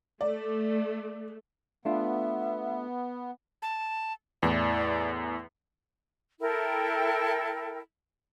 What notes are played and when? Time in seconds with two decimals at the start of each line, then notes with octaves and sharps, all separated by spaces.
0.21 A3 D5
1.85 A3 B3 D4 F4 E5
3.62 A5
4.43 E2 A2 E3 D5
6.40 E4 A4 A#4 G5